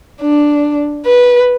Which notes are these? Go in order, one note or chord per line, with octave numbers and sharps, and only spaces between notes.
D4
B4